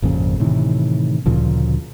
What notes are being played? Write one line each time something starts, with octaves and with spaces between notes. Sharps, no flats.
G#1 F2 A#2 C#3
A2 C3 D#3 E3
D2 A#2 C#3 F3